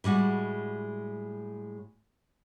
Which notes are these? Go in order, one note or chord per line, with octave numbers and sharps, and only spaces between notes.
A2 G3 G#3 F#4